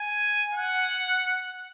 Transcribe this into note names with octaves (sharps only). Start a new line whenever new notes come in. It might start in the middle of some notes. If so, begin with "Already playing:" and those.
Already playing: G#5
F#5